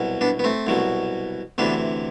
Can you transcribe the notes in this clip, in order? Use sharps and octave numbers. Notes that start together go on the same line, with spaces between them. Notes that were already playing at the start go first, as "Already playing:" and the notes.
Already playing: C2 B2 F#3
B3 D4
B3
A3 C4
C2 B2 F#3
D2 C3 E3 B3 D4